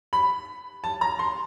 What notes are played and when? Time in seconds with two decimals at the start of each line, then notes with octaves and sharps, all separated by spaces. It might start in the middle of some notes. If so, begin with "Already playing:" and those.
0.13 B5
0.84 A5
1.01 A#5
1.19 C6